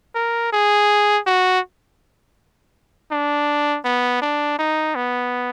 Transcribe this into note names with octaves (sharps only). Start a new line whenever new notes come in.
A#4
G#4
F#4
D4
B3
D4
D#4
B3